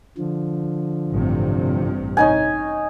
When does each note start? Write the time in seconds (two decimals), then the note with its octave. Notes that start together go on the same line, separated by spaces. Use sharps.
0.18 D3 F3
1.12 A1 G2 C3
2.17 C#4 D#4 G#5